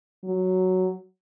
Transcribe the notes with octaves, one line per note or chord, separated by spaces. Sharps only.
F#3